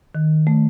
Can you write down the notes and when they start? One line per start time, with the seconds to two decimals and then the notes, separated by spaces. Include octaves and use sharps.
0.15 D#3
0.47 A3